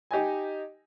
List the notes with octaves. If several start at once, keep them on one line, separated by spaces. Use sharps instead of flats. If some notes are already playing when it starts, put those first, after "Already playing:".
D#4 G4 D#5 G#5